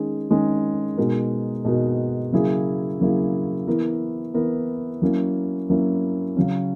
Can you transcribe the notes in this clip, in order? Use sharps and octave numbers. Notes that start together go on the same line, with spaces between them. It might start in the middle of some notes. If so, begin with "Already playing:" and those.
Already playing: D#3 G#3 C#4 G#4
D#3 G#3 C#4 G#4
B2 G#3 D#4 F#4 A#4
B2 G#3 D#4 F#4 A#4
C#3 F#3 A#3 E4 G#4
C#3 F#3 A#3 E4 G#4
E3 B3 E4 A#4
E3 B3 E4 A#4
F#3 A#3 C#4 E4
F#3 A#3 C#4 E4
C#3 F#3 C#4